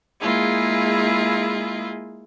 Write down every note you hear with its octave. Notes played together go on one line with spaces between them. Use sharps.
G#3 A#3 E4 F4 G#4